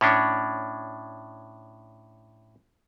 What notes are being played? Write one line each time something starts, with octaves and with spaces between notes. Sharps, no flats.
A2 C#4 D4